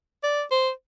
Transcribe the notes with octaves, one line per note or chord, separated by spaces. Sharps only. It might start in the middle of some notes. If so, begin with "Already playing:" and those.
D5
C5